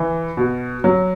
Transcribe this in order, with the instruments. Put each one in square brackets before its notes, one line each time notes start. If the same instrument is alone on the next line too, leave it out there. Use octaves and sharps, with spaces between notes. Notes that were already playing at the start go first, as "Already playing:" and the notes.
Already playing: [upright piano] E3
B2
F#3